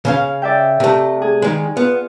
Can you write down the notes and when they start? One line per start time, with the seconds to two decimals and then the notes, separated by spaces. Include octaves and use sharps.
0.05 C#3 C#4 F5
0.42 D5 E5 G5
0.80 C3 A3
1.22 G#4
1.42 D#3 G#3
1.77 B3 F4